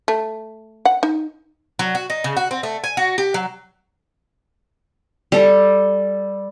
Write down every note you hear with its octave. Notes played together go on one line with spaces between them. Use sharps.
A3
F#5
D#4
F#3
F#4
D#4
C#3
F#4
C4
A3
G#5
F#4
G4
F#3
G3 A4